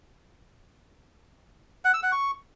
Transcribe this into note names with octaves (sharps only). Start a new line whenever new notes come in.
F#5
E6
F#5
C#6